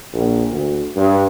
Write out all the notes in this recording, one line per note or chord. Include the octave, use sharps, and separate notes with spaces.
A#1
D2
G2